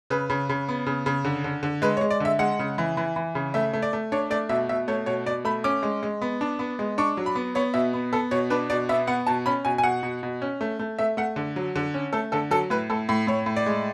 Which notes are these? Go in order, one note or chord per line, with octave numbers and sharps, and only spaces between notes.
C#3 B4
C#3
C#3
B3
C#3
C#3
D3
D3
D3
G#3 B4
C#5
G#3
D5
D3 E5
G#3 F#5
C#3
E3
E3
E3
C#3
A3 E5
A3
D5
A3
D4 C#5
A3 D5
B2 E5
B2 E5
A3 C#5
B2 C#5
B2 D5
A3 B5
C#4 D6
G#3
G#3
B3
D4
B3
G#3
D4 C#6
F#3
B5
B3
B3 C#5
B2 E5
B3
B3 A4
B2 C#5
D4 B4
B2 D5
B3 E5
B3 F#5
B2 A5
C#4 B5
B2 G#5
G#5
B2 F#5
B2
B2
C#4
A3
A3
A3 E5
A3 F#5
D3
F#3
D3
C#4
A3 A4
D3 A4
F#3 A4
A2 B4
A2 A4
A2
A2 C#5
A2
D5
G#3